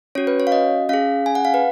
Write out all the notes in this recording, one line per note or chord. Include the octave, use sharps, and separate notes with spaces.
C#4 F#4 C#5
B4
C#5
F5
D#5
C#4 G#4 F5
G#5
F#5
F5
B4